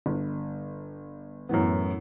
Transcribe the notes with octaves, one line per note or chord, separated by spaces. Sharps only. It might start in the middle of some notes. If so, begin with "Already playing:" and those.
G1
F#2 A2 E3 B3